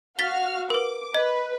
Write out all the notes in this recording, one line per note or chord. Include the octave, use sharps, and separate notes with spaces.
F#4 F5 F6 A6 B6 G7
A#4 B4 D6
B4 D#5